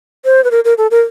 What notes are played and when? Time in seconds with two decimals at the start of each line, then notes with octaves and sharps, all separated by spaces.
0.25 C5
0.44 B4
0.51 A#4
0.65 A#4
0.78 A4
0.91 A#4